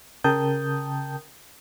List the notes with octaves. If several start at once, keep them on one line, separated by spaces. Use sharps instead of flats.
C#3 A#4 G5 A5 D#6 G6